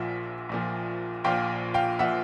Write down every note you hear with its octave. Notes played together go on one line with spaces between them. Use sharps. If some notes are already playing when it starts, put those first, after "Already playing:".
Already playing: A#1 A#2 F3 E5 F#5
A#1 A#2 F3
A#1 A#2 F3 F5 G5
F5 G5
A#2 F3 E5 F#5